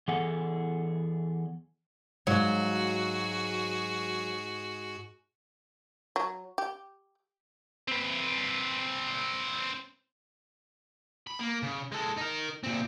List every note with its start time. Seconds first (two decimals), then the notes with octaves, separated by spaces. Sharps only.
0.08 E3 B3 G#4 A4 F#5
2.27 G#2 F#3 F4 F#4 G#4
6.16 F#3
6.58 G4
7.88 C4 B4
11.27 B5
11.40 A#3
11.63 C#3
11.92 G#3 A4
12.17 D#4 A#4
12.63 A#2 C4